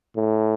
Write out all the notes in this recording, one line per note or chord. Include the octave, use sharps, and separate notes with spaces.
A2